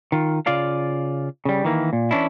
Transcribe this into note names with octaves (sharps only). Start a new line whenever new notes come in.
D#3 F4
C#3 F4 D5 F5
C#3 G3
D#3 E3 A#3
A#2
E3 C#4 D4 E4